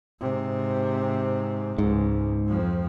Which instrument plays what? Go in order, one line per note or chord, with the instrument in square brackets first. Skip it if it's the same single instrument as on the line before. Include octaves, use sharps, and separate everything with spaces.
[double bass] G#2 C3
[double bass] C#2 [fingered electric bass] G#2
[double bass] F2 F3